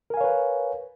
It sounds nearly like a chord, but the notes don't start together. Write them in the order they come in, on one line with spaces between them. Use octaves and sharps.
A#4 G#5 F5 C#5 B4